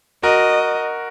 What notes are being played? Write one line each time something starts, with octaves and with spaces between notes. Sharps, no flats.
F#4 A#4 D#5